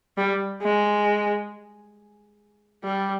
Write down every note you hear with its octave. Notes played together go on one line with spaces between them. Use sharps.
G3
G#3
G3